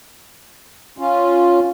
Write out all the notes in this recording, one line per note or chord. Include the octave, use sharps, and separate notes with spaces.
C#4 F4